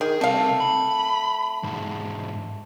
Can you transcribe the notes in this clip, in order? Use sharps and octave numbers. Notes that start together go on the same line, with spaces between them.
D#3 G#4
C2 A3 C4 F5
B5
E2 G#2